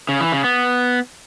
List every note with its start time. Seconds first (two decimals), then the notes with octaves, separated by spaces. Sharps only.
0.09 C#3
0.21 E3
0.32 C#3
0.44 B3